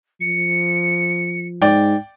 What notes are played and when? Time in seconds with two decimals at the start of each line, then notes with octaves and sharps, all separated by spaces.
0.21 F3 C#7
1.62 G#2 D5 G5